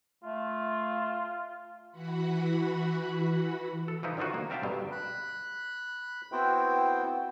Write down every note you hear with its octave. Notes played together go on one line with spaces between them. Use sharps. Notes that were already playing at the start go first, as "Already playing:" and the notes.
A3 F4
E3 F#4 F#5 B5
A4
E3 F3 D#4 E4
D3 D#3 F3 F4 F#4
A#3
C4 A#4 E5 F5 G5 A5
G2 B2 D3 F#3
B5 F#6
B3 C4 E4 F#4 C5 G5